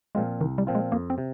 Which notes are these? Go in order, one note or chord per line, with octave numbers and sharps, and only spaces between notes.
A#2 F3 G#3 C4 F4
C2 D#3
G3
A#2 F3 C4 F4
G#3
F2 A#3
C4
C3